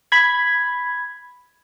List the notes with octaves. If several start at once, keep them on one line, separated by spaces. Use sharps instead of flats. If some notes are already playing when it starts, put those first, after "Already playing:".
B5 G#6